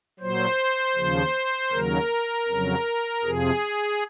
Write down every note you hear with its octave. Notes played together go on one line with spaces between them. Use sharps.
A#2 F#3 C5
D#2 C#3 F3
D#2 C#3 F#3 A#4
F2 C#3 F#3
F2 C3 F3 G#4